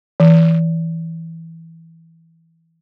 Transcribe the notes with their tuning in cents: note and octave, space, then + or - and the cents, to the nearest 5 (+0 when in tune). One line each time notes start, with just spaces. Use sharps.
E3 -5